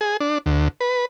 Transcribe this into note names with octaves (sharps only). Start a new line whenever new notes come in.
G#4
D4
D2
B4